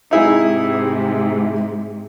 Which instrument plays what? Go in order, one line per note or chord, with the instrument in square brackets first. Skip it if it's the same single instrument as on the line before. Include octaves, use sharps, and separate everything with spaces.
[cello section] G#2 C3 [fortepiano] D#4 E4 G#4